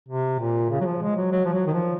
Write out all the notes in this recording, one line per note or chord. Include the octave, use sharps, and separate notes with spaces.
C3
A#2
C#3
F#3
F3
G#3
F#3
F#3
F3
F#3
D#3
F3